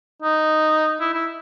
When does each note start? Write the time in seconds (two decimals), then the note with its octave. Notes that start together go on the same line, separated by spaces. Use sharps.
0.22 D#4
1.00 E4
1.14 E4